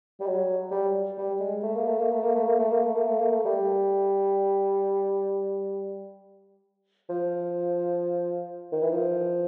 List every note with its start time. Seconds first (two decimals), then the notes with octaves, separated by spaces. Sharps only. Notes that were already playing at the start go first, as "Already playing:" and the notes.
0.20 G3
0.27 F#3
0.71 G3
1.18 G3
1.40 G#3
1.63 A3
1.75 A#3
1.86 A3
1.99 A#3
2.11 A3
2.23 A#3
2.35 A3
2.47 A#3
2.59 A3
2.71 A#3
2.84 A3
2.95 A#3
3.07 A3
3.19 A#3
3.32 A3
3.45 G3
7.10 F3
8.72 D#3
8.82 E3
8.92 F3